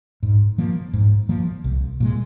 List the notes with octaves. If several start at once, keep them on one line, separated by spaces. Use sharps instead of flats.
G#2
F3 A#3
G#2
F3 A#3
C2
A#2 F3 G#3